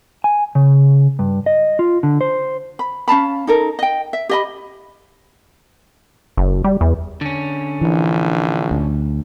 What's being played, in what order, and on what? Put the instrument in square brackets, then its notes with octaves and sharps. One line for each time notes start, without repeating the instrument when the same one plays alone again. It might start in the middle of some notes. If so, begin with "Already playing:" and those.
[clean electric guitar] G#5
C#3
G2
D#5
F4
D3
C5
[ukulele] B5
C#4 F5 A5 B5
D#4 A4 A#4
D#5 G5
E5
G4 D#5 B5
[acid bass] F#1
G3
E2
[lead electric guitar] D3 C#4
[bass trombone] A#1 [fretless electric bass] E3
[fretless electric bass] D2